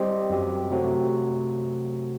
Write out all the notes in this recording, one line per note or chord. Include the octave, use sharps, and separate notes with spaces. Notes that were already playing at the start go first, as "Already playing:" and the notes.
Already playing: G3 C4 G4 C5 D#5
F#2 F#3 C4 G4
C3 F#3 A3 C4 F#4